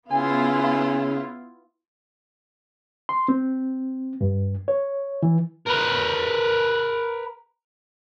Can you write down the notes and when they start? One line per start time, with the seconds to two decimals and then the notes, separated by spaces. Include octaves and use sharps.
0.11 C#3 B3 E4 F4 F5 G#5 C6
3.09 C6
3.28 C4
4.21 G2
4.68 C#5
5.23 E3
5.67 A#4 B4